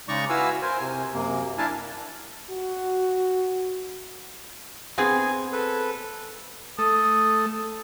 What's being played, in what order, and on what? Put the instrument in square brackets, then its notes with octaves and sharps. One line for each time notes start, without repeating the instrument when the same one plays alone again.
[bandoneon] C#3 G#3 D#4 D5 A#5 C#6
E4 F#4 B4 F5 G#5 E6
A#4 C5 G#5
C3 G#5
F#2 C3 A#3
D4 E4 A#4 F5 G#5 A5
[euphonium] F#4
[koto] B3 C4 G#4 [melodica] G#5
[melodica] A4 B4
[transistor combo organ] A3 A4 [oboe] D#6